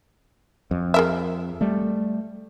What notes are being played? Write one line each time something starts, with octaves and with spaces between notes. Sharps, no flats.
F2
G#4 A#4 E5
G3 A3